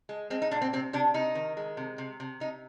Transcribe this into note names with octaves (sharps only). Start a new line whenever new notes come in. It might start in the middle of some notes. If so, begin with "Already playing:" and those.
G#3
G#3 C4
D#4
A#2 D4
C4
C3 C4
C3 D4
C3 D#4
D#3
G#3
C3
C3
C3
C3 D#4